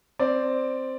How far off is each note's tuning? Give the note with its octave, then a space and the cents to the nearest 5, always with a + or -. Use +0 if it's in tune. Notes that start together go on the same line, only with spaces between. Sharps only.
C4 +0 D5 +0